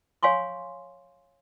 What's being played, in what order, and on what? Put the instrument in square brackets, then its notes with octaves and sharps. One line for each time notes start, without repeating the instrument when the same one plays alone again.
[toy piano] C#5 F5 G#5 C6 C#6